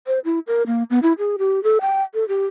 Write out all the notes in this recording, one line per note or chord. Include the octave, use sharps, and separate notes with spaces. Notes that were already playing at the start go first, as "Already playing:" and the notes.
C5
E4
A#4
A#3
B3
E4
G#4
G4
A4
G5
A4
G4